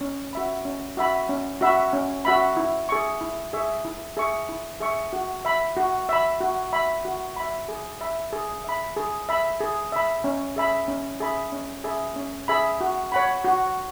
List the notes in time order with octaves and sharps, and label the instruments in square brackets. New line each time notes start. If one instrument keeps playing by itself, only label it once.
[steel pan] C#4
F#4 E5 B5
C#4
F#4 E5 B5
C#4
F#4 E5 B5
C#4
F#4 E5 B5
E4
G#4 E5 C#6
E4
G#4 E5 C#6
E4
G#4 E5 C#6
E4
G#4 E5 C#6
F#4
E5 B5
F#4
E5 B5
F#4
E5 B5
F#4
E5 B5
G#4
E5 B5
G#4
E5 B5
G#4
E5 B5
G#4
E5 B5
C#4
G#4 E5 B5
C#4
G#4 E5 B5
C#4
G#4 E5 B5
C#4
G#4 E5 B5
F#4
C#5 F#5 B5
F#4